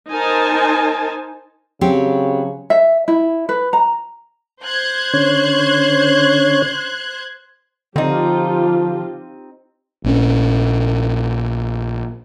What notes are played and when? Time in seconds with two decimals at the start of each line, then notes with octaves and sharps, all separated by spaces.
0.10 D#4 A#4 C5 G#5 A5
1.81 C#3 F#3 C4 G4
2.70 E5
3.08 E4
3.49 B4
3.73 A#5
4.64 C5 F#6 G#6
5.14 D3 C#4 C#5
7.96 D3 F3 C4 D#4 F4 G4
10.04 A#1 C4 C#4